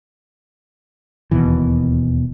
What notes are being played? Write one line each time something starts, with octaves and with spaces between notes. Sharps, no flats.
E1 D#2 B2 E3